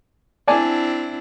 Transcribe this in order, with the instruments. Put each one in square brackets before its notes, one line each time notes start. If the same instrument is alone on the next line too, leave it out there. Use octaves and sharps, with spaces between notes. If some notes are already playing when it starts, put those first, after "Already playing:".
[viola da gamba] C4 D4 E4 [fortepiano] D5 G#5 A5